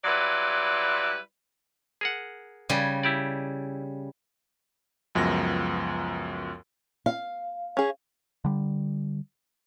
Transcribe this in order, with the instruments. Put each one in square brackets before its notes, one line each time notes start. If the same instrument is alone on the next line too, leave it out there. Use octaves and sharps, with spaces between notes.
[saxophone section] F#3 G3 E4 F4 B4 D5
[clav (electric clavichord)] G#4 A#4 F#5
[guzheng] C#3 G3 G#5
[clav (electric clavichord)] E4 G4 D5
[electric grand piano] C#2 F#2 F3 B3 A#6
[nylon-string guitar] F5
[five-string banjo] C#4 G#4
[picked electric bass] D3 G3